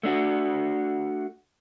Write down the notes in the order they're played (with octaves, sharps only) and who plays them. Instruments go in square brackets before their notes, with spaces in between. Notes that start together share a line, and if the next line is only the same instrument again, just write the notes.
[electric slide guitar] A3 D4 F#4